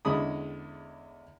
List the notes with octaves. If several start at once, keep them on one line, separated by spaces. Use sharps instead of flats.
E2 D3 G#3 C#4 B5 D#6